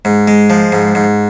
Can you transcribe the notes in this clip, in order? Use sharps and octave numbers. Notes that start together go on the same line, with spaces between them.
G#2
G#3
F3
G#2
G#2